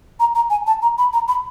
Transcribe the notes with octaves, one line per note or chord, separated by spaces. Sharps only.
A#5
A#5
G#5
A5
A#5
B5
A#5
B5